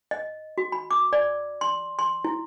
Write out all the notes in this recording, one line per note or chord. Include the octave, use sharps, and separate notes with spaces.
D#5
F#4
B5
D6
D5
C6
C6
E4